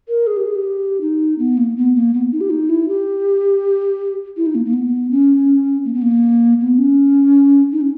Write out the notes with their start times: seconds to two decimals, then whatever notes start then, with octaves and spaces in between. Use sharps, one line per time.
0.09 A#4
0.27 G#4
0.37 G4
0.45 G#4
0.55 G4
1.01 D#4
1.39 B3
1.57 A#3
1.77 B3
1.95 A#3
2.14 B3
2.32 D#4
2.41 G4
2.50 D#4
2.69 E4
2.88 G4
4.37 E4
4.46 D#4
4.55 A#3
4.65 A#3
4.73 B3
5.11 C#4
5.85 A#3
5.94 B3
6.02 A#3
6.61 B3
6.78 C#4
7.72 D#4
7.81 C#4